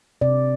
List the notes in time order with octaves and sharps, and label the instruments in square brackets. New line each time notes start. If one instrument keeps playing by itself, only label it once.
[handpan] C3 D5